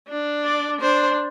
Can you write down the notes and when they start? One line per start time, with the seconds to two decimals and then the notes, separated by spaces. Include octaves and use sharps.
0.08 D4
0.44 D5
0.80 D4 C5